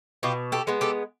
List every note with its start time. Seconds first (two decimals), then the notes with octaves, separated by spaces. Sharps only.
0.23 B2 F4 G4
0.52 G4 A4
0.67 G#3 B3
0.81 G4 A4